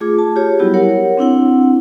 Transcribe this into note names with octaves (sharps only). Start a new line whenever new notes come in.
A3 F4 G#4 D6
A5
F4 G4 G#4 C#5
F#3 G3 B3 E4 F#4 G4
A#4 C#5 F#5
C4 D4 E4 F#5